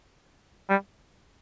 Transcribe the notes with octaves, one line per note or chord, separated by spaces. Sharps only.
G3